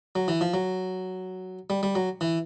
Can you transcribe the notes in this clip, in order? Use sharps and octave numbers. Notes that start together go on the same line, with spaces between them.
F#3
E3
F3
F#3
G3
G3
F#3
E3